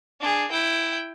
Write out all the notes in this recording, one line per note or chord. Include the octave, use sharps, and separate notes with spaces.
D4 G#4
E4 G5